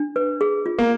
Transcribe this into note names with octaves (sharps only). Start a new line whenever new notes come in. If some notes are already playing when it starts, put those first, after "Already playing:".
Already playing: D4
B4
G#4
F4
A#3